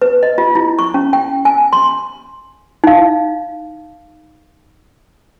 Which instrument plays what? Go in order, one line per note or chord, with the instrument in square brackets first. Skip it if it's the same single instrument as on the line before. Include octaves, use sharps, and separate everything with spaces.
[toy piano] B4
D#5
F4
E4
C#6
C#4
G5
G#5
C6
D#4 F5